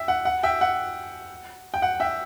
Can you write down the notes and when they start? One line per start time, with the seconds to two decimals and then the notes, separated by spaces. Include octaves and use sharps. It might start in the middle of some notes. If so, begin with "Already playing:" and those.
Already playing: E5 G5
0.08 F#5
0.25 F#5
0.43 E5 G5
0.61 F#5
1.74 G5
1.82 F#5
2.00 E5 G5